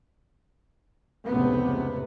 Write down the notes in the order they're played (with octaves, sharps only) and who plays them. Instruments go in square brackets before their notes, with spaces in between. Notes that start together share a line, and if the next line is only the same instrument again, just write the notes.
[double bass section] F1 C#2 A2 C3 B3